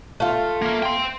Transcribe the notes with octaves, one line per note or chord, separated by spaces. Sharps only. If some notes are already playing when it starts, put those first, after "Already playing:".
A3 F4
A#3 A#4
G5 C6